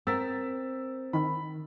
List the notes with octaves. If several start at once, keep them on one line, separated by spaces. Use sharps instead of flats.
C4 A#4 E6 A6 B6
D#3 B5